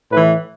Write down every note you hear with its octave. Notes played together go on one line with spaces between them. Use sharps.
A2 E3 B4